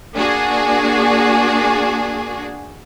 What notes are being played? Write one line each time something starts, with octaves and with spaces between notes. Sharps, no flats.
A#3 D4 F#4 G#4